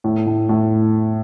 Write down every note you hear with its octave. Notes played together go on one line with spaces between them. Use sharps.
A2
A2
A2